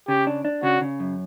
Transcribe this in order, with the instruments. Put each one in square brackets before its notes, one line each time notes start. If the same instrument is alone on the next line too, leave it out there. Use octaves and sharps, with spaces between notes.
[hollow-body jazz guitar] C#3 [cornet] G4
[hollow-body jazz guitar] D4
D4
[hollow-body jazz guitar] C#3 [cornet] F#4
[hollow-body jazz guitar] C#3
F#2